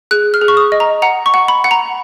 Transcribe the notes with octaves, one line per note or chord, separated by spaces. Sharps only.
G#4 F#6
F6
G#4
C#6
D#6
D#5
A#5
F#5 A#5
C#6
F#5
B5
F#5
A#5